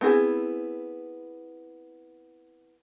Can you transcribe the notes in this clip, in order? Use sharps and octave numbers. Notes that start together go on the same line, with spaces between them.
B3 C4 E4 G#4